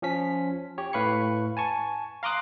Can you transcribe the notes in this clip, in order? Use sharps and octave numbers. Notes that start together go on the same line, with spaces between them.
F3 C#4 B6
G4 C#5
A2 B4 F5 B5 C#6 C#7
G#5 A5 C#6
F5 A#5 C6 D6 D#6 F#6